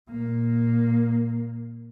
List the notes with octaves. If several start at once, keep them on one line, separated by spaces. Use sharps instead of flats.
A#2 A#3